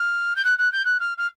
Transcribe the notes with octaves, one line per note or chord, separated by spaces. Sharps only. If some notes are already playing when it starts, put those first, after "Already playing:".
Already playing: F6
G6
F#6
F#6
G6
F#6
F6
F6